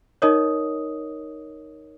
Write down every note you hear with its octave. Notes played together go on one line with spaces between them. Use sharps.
D#4 A#4 C#5 D#5 D#6